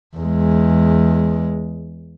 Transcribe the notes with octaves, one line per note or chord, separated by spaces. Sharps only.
E2 G#3